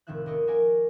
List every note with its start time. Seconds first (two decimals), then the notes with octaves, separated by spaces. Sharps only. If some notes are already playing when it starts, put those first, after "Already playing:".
0.07 C2 A2 D#3 F3 E5 F#6
0.26 D#1 A#4 D5 D#5 C#7
0.47 F#4 A#4 D5 G#5